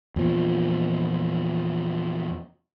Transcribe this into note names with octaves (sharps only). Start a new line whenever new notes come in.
E2 A#2 F3